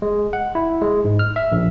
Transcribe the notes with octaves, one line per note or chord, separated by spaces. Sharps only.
G#3
F#5
E4
G#3
G#2
F6
E5
A#1